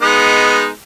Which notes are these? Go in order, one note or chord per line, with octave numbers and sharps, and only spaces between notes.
G#3 B3 D#4